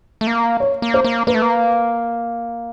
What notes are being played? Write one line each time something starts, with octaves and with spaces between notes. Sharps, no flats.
A3
A#3
C#5
A#3
C5
A#3
A#3 B4
A3
A#3